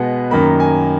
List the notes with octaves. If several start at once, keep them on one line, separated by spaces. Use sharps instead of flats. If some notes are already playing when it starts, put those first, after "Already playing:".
Already playing: B2 G#3 B3 F#5
F#2 D#3 A#3 B5
G#5